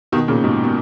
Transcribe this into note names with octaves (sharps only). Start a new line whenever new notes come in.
B2 D#3
A#2 C#3
G#2 B2
B2